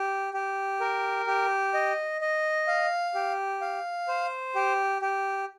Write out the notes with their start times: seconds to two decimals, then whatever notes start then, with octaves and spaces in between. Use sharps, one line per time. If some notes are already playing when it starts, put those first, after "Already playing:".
Already playing: G4
0.34 G4
0.80 A#4
1.27 G4
1.74 D#5
2.21 D#5
2.68 F5
3.15 G4
3.61 F5
4.08 C5
4.55 G4
5.02 G4